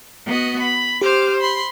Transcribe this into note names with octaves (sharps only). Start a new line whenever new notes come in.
B3 F#4 D#5
B5
G4 C5 D6 F6
B5 C6